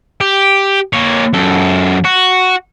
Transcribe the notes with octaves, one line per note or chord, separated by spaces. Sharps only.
G4
A#3 C#5
F#2 A4
F#4